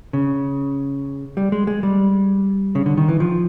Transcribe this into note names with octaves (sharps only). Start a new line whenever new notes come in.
C#3
G3
G#3
G#3
G3
C#3
D3
D#3
E3
F3